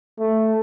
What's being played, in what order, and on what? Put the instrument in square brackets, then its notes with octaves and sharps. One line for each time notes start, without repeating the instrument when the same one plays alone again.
[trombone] A3